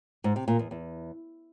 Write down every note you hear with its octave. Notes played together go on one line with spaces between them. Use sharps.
G#2
C3
A#2
E2
E2